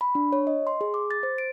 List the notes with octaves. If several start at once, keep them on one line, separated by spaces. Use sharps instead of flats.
B5
D4
C#5
D#5
C6
G#4
D6
A6
C5
D7